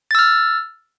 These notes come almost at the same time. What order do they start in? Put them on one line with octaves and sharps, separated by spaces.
A6 E6 F6